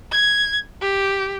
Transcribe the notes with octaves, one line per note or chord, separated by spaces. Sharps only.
G#6
G4